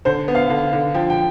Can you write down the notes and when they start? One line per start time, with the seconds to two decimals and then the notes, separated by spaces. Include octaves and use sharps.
0.05 D3 C5
0.28 B3
0.35 F5
0.50 D3
0.73 D3
0.94 F3 G5
1.10 G5